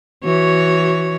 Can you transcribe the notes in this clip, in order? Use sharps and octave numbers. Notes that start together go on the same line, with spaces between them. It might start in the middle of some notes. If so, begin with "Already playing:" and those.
E3 F#4 C#5